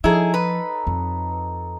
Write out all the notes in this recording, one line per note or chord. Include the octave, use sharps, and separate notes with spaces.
F3 D#4 E4 G#4 A4 C#5
B4
F2